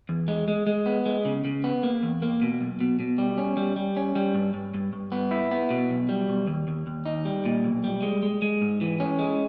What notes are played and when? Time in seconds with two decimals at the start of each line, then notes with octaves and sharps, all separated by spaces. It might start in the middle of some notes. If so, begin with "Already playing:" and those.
0.09 E2
0.28 G#3
0.48 G#3
0.67 G#3
0.86 B3
1.06 G#3
1.25 C#3
1.45 C#3
1.64 B3
1.83 A#3
2.03 E2
2.22 A#3
2.41 B2
2.61 B1
2.80 B2
3.00 B2
3.18 G3
3.38 C#4
3.57 G3
3.76 G3
3.97 C#4
4.15 G3
4.35 G2
4.54 G2
4.74 G2
4.93 G2
5.12 B3
5.31 E4
5.51 B3
5.70 B2
5.90 B1
6.09 G3
6.29 B1
6.47 D#2
6.68 D#2
6.87 D#2
7.06 D#4
7.25 G3
7.45 A#2
7.64 B1
7.84 G3
8.02 G#3
8.23 G#3
8.42 G#3
8.62 G#2
8.81 E3
9.00 C#4
9.19 G#3